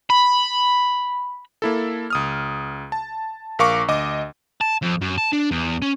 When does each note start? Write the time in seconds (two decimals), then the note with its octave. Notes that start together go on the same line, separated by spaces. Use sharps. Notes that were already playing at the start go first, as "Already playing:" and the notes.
0.10 B5
1.62 A#3 E4 A4
2.10 C#2 D#6 F6
2.92 A5
3.59 A#1 A#4 F5 C#6 D6
3.88 D2 D#5 D6
4.61 A5
4.82 F2
5.02 F#2
5.18 A5
5.33 D4
5.51 E2
5.82 C#4